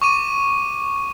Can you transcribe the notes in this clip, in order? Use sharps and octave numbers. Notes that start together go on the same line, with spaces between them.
C#6 D6 D#7